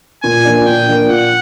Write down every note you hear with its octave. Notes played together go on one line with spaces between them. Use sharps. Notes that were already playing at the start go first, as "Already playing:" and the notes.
A#2 G#5
F3 A#3 D4
A#2 G5
F3 A#3 D4
A#2 F#5